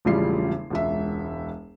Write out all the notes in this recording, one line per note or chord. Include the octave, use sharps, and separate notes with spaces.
E1 A1 C#3 F3 G3 C7
E1 C#2 E5